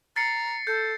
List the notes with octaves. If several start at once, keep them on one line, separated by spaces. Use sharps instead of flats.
A#5 A6 C7 C#7
A4 G6